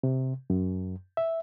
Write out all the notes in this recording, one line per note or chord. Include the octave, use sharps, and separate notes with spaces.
C3
F#2
E5